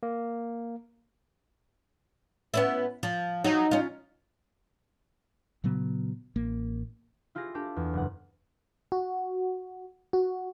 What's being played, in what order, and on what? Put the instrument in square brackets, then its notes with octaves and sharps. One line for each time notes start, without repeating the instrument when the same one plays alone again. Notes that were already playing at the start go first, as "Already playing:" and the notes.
[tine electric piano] A#3
[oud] B3 C#4 E4
F3
[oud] F#3 [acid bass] D#4
[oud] C#4 F4
[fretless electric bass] A#2 C#3 F#3 B3
A1 A#3
[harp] E4 F4 G4 G#4 A#6
D4 G4 A4
E2
F#1 F#5
[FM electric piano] F#4
F#4